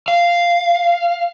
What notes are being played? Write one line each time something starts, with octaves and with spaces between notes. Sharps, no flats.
F5